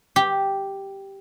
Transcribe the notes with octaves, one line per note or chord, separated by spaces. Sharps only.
G4